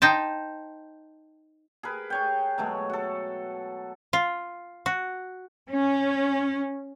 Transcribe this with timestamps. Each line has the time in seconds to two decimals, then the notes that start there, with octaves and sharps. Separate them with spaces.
0.02 D#4 C5 G5 A5
1.83 G#4 A#4 B4
2.10 G#4 C#5 G5
2.58 B2 F#3 G#3 A3
2.90 F#4 A4
4.13 F4
4.86 F#4
5.68 C#4